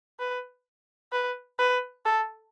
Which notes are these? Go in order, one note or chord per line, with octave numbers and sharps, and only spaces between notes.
B4
B4
B4
A4